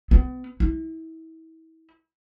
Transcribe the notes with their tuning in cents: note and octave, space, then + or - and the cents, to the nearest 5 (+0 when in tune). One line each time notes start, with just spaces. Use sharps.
B3 +40
E4 -35